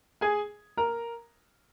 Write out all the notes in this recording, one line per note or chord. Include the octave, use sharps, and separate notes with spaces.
G#4 G#5
A#4 A#5